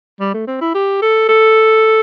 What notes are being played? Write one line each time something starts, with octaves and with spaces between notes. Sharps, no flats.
G3
A3
C4
E4
G4
A4
A4